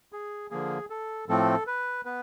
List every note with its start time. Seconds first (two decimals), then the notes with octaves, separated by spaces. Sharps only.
0.13 G#4
0.51 D3 F3 A#3 G#4
0.90 A4
1.29 A2 F3 A3 C4 A4
1.67 B4
2.05 B3 B4